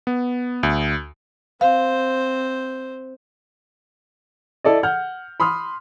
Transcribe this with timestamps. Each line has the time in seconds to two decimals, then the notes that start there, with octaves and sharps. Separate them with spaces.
0.07 B3
0.63 D2
1.61 C4 C5 F5
4.64 E4 A4 D5 D#5
4.83 F#5 F6 G6
5.40 B5 C6 D#6 F6